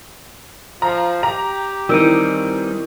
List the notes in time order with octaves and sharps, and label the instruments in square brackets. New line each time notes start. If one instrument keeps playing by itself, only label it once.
[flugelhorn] F3 [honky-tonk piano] A#5
[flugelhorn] G4 [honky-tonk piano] A#5
[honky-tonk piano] D#3 E3 [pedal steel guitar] G3 C4 D#4 [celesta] E6 D7 D#7